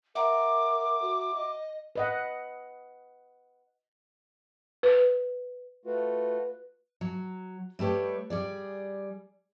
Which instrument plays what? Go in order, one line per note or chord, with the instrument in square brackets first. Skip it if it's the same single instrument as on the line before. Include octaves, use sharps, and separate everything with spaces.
[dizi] A#4 [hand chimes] E5 F#5 A#5 [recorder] D6
[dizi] F#4
D#5
[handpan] B4 D#5 F#5
[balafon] B4
[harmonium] A3 F4 F#4 [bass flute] B4
[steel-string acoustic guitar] F#3
G3 A3 G4 B4 C#5
G3 G#4 D5